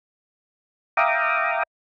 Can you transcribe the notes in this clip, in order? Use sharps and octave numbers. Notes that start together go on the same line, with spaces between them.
E5 F5 G5 A#5 D6 D#6